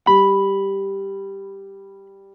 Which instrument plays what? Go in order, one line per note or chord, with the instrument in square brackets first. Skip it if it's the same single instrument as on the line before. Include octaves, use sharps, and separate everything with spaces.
[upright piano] G3 [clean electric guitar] B5